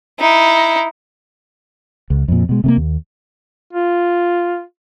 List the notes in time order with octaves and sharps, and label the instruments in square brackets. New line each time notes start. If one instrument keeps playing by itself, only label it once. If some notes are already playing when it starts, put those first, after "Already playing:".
[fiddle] D#4 E4
[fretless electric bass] C#2
F2 A#2
B2 G#3
C3 A3 A#3
D#2
[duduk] F4